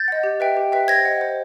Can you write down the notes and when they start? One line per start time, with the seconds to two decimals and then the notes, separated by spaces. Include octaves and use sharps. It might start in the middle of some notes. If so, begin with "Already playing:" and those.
Already playing: G6 A6
0.08 D#5 F#5
0.24 G4
0.40 B4 E5 G5
0.57 G4
0.72 B4 E5 G5
0.88 C5 G#6 A#6
1.05 D#5 F#5
1.21 C5